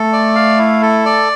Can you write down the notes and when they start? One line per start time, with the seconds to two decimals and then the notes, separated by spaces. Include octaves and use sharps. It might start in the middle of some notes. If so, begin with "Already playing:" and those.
Already playing: A3 A4
0.13 D5
0.35 F5
0.58 E4
0.82 A4
1.05 D5